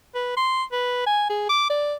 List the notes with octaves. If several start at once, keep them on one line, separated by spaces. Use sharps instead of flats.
B4
C6
B4
G#5
G#4
D6
D5